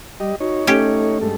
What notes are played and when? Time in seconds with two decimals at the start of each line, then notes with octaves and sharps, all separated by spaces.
0.20 G3 G4 D#5
0.40 D#4 F#4 C#5
0.67 A3 C#4 G4
1.21 G2 G#3 A4